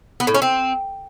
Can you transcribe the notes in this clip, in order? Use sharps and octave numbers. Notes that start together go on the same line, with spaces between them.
B3
A2
C#4
C4